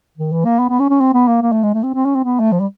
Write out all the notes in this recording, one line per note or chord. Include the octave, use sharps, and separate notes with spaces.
D#3
E3
A#3
B3
B3
C#4
C#4
C4
B3
A#3
A#3
A3
G#3
A3
C4
C4
C#4
C4
B3
A3
F3
G3